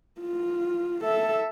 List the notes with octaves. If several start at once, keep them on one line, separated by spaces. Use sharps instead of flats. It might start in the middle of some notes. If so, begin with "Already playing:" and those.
F4
A4 E5